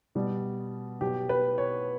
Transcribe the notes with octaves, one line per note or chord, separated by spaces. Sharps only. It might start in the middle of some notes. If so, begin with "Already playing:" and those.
B2 G3
B2 F#3 G4
B4
C#5